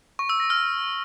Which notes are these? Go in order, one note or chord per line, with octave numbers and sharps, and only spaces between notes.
C#6
E6
A#6
F6